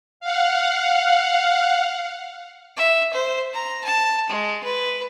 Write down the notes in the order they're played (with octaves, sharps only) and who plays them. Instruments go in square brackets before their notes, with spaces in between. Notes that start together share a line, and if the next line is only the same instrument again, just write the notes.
[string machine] F5 F#5
[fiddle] E5
C5
A#5
A5
G#3
B4